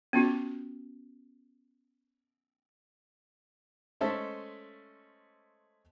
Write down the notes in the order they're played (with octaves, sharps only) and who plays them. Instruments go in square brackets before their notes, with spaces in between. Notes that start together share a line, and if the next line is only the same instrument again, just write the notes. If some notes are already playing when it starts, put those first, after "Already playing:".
[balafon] B3 C#4 F4 F#4
[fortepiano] G#3 A3 C#4 A4 C5 E5